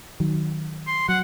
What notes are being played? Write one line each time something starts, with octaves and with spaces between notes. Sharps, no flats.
D#3 F#3
C6
F#3 F#5